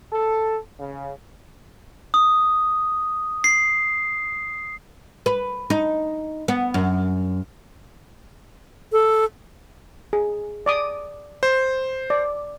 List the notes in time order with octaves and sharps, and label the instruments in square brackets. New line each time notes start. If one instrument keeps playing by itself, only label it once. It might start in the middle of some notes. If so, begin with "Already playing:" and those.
[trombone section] A4
C#3
[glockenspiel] D#6
C7
[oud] B4
D#4
B3
F#2
[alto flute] A4
[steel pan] G#4
D5 D6 D#6
[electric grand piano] C5
[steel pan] D5